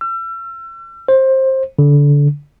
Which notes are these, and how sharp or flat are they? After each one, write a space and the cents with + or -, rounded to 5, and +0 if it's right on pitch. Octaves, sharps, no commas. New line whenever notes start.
E6 +40
C5 +20
D3 -25